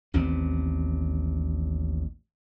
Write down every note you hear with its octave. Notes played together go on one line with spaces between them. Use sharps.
A1 D#2 B3 C4